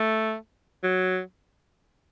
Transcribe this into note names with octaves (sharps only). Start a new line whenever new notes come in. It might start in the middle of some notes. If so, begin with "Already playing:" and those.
Already playing: A3
F#3